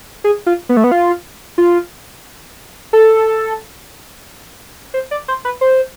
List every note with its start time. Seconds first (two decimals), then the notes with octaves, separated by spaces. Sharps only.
0.24 G#4
0.46 F4
0.69 B3
0.77 A3
0.84 B3
0.92 F4
1.58 F4
2.93 A4
4.94 C5
5.11 D5
5.28 C5
5.45 B4
5.61 C5